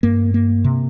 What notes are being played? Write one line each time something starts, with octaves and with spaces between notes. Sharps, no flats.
G2 A#3
A#3
C3